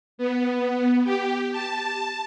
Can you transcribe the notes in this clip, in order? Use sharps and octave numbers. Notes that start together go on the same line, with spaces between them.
B3
G4
A5